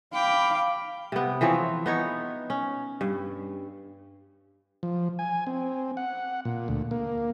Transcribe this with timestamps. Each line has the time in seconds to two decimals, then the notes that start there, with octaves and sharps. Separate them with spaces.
0.14 F5 G5 B5 D6
1.12 C3 B3
1.41 E3 F3 C4 C#5
1.86 B3 D#4 C#5
2.50 C#4
3.01 G2
4.83 F3
5.19 G#5
5.47 C4
5.97 F#5
6.45 A#2
6.68 D2
6.91 A#3